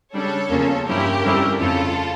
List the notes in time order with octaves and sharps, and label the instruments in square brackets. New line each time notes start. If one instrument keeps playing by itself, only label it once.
[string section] C#3 G3 D4 A4 C#5
E2 C#3 F3 A#3 C#4
G2 F3 C#4 E4 G4 A#4
F2 D3 G3 C#4 E4
F2 C#3 F3 A3 E4 F4 A4